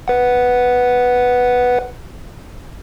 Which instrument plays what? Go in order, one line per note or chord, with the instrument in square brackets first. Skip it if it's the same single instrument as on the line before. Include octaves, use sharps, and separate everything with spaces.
[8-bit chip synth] B4 F#5